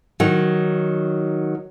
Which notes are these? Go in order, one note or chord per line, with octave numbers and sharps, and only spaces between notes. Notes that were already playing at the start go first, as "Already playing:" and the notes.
D#3 F#3